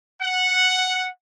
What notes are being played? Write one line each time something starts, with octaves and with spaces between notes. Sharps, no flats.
F#5